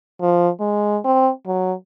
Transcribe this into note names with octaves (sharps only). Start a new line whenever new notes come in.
F3
G#3
C4
F#3